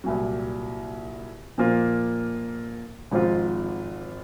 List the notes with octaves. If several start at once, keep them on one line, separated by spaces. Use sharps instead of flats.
C2 A#2 F#3
A#2 F3 A#3 F4
G#1 G#2 F3 C4 F4